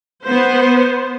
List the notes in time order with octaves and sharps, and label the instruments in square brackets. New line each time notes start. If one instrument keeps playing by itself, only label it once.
[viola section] B3 C5